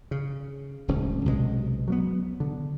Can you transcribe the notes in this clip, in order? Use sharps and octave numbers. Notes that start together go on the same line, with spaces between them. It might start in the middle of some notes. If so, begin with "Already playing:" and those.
C#3
D1 C#2 C#4
B1 C3 E3 G#3
F#3 A#3 B3
D3